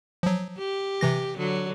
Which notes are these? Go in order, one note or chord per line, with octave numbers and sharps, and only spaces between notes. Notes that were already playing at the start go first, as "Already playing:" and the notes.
F3 F#3
G4
C3 E3 A#6
D3 F#3